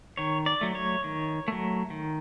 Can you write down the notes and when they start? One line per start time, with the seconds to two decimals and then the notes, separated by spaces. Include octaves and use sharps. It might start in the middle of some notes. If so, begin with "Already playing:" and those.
0.17 D#3 C#5
0.46 D5
0.61 F#3 A3
0.75 C#5
1.04 D#3
1.48 F#3 A3
1.90 D#3